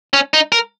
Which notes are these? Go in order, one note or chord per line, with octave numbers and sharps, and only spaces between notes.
C#4
D#4
A#4